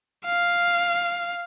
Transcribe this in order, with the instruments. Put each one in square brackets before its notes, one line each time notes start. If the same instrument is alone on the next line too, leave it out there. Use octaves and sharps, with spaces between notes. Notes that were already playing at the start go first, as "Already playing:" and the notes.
[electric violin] F5